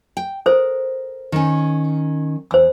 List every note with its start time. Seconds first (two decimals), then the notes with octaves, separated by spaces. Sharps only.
0.17 G5
0.46 A4 A#4 C5
1.32 D#3 C#4
2.51 E2 C5 E6